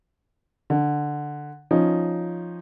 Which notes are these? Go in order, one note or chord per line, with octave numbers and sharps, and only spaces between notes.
D3
F3 C#4 D#4